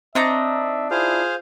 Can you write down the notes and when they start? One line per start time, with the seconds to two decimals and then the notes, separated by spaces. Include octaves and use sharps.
0.15 C4 D4 D#4 E5 A#5
0.91 E4 F4 G#4 C5 F5